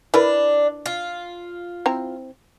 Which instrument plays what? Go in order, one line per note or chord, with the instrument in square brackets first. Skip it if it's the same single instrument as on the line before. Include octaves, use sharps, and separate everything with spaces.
[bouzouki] D4 [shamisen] E4 A#4 B4
[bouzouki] F4
[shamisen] C4 E4 A#5